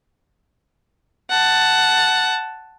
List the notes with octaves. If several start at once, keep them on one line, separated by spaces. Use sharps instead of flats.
F#5 A5